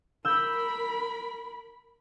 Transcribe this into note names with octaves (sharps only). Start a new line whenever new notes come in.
A#4 B5 E6 G6